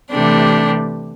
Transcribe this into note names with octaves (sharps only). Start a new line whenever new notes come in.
C3 E3 A3 D4 G4